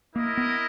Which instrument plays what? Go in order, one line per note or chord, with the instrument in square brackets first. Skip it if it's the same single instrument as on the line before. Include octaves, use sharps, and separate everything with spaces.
[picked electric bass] A#3 [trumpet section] E4 A#4 D#5
[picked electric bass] B3